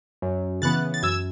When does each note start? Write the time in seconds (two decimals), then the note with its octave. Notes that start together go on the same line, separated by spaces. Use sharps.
0.22 F#2
0.62 C#3 E3 B3 F#6 A6
0.94 A6
1.03 F#2 E6 G#6